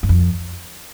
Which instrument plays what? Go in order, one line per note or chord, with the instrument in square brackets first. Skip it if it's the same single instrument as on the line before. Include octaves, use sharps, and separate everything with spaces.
[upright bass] G2
F2